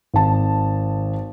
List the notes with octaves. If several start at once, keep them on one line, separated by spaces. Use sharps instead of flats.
G#1 A5